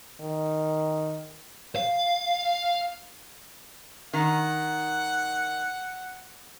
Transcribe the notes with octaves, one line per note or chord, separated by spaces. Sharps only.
D#3
F5
D#3 F#5